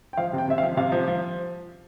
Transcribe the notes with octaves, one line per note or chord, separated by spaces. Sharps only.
G5
F3 F5
C3
G5
C3 E5
F5
F3
C3 F5
F3
F3